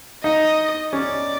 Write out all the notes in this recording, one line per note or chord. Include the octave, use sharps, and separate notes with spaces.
D#4 D#5
C#4 D5